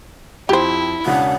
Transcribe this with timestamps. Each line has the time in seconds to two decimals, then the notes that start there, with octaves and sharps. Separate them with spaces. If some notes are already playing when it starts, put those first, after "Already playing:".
0.49 F2 E4 G4 C5
1.06 E1 C#3 D4 F#5